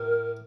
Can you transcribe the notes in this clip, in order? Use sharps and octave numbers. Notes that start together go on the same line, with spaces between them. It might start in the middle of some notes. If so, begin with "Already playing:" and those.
Already playing: A2 A#4